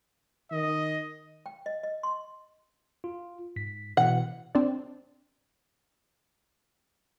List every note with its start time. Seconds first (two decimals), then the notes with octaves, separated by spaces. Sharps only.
0.52 D#3 D#5
1.46 G5
1.66 D#5
1.83 D#5
2.03 C6
3.04 F4
3.56 G#2 B6
3.97 B2 E3 F#5
4.55 C4 D4 D5